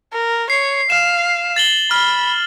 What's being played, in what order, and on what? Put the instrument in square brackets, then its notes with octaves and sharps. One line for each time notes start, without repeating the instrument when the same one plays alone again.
[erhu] A#4
[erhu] C#5 [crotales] C7
[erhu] F5 [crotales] E7
[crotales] A6 F#7 G7
[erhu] B5 [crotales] F6